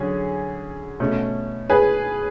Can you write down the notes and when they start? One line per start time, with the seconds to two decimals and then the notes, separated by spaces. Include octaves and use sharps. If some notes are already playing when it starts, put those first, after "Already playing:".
Already playing: D3 F#3 C#4 G#4
1.00 B2 A3 C#4
1.70 G#4 B4